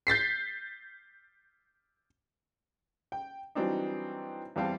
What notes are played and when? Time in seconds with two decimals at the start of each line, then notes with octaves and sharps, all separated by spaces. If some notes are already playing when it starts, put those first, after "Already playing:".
0.07 G6 A6 B6 C7
3.12 G5
3.55 E3 F#3 G3 C4 D4 D#4
4.56 E2 G3 C4 F5 A5